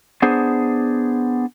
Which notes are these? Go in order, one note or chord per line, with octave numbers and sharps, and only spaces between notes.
B3 D4 G#4 C5